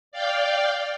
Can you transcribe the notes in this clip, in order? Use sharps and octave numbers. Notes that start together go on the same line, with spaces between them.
D5 F5 G5